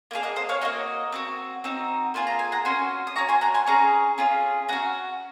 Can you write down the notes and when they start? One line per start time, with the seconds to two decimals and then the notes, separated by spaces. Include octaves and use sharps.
0.11 A#3 F4 G#4 F5
0.23 D#5 F#5
0.36 C5 D#5
0.49 C#5 F5
0.61 A#3 D#4 F#4 D#5 F#5
1.12 C4 D#4 F#4
1.64 C4 D#4 F#4
2.14 A#3 F4 G#4 C6
2.27 A#5
2.39 G#5
2.52 F#5 A#5
2.65 C#4 F#4 G#5 C6
3.07 D#6
3.16 C#4 F#4 A#5 C#6
3.29 G#5 C6
3.41 F#5 A#5
3.54 G#5 C6
3.67 C#4 G#4 A#5 C#6
4.18 C#4 F4 G#4
4.69 C#4 F#4 F#5 A#5